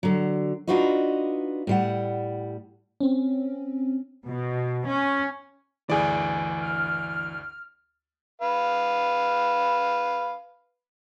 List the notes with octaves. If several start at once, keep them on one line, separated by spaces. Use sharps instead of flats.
D3 F#3
D4 D#4 F4 F#4 B4 D#5
A2 G3 F#5
C4 C#4
B2
C#4
G1 D2 E3 G#4 D5
F6
B4 F5